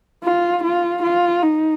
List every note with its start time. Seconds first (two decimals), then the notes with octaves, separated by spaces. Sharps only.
0.24 F4
0.64 F4
1.03 F4
1.42 D#4